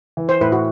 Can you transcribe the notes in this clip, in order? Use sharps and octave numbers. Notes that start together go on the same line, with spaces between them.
E3
C5
A2 B4
F#4